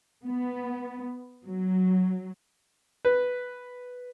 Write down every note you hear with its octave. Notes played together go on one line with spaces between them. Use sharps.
B3
F#3
B4